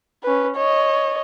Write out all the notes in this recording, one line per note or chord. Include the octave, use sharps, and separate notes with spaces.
C#4 B4
C#5 D#5